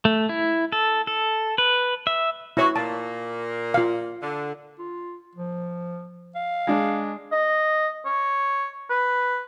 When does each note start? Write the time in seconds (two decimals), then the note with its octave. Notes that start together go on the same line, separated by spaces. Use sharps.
0.05 A3
0.29 E4
0.72 A4
1.07 A4
1.58 B4
2.07 E5
2.57 E3 E4 F#4 C#5
2.76 A#2 A#3 A5
3.74 F4 F5
4.22 D3
4.79 F4
5.35 F3
6.35 F5
6.67 G#3 D4
7.32 D#5
8.06 C#5
8.90 B4